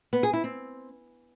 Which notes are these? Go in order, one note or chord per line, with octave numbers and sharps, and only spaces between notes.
B3
G#4
E4
C4